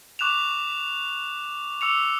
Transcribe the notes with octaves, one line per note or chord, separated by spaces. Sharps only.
C#6 D6 F#6 E7 F7
D6 E6 C#7 F7